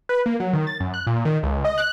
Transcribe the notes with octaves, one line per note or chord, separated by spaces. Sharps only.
B4
A#3
F#3
D#3
A6
F#2
F#6
A#2
D#3
C#2
D#5
F#6